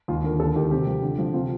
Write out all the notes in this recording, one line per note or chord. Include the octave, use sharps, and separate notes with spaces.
D#2 F4
D3 A#4
D#2 A4
D#3 G4
C3 G4
F3
D3
F3
C3 F4